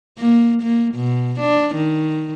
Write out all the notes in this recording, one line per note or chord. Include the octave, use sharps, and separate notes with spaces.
A#3
A#3
B2
D4
D#3